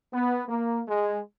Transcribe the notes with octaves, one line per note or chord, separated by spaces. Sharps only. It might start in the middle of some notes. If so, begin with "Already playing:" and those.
B3
A#3
G#3